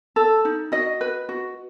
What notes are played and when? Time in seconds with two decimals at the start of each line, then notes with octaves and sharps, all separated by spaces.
0.16 A4
0.45 D#4
0.72 F#4 D#5
1.01 B4
1.29 F#4